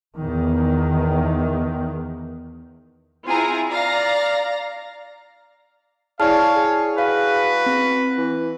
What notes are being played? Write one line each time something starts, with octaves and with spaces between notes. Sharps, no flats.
E2 D#3
C4 E4 F4 G#4 G#5 A#5
D5 F5 A#5 A#6
E4 G#4 C#5 D5 F5 A5 F6
G#4
F#4 B4 F5
C4
E3